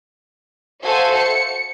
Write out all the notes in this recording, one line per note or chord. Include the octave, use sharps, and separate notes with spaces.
F#4 A4 C5 E5 F5 G#5
C#7